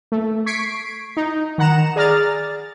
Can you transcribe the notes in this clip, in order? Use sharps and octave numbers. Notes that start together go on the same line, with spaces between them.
A3
C#6 G#6 B6 C7 D7
D#4
D#3 F#5 A#5 E7
G#4 D5 A#5 F6 A6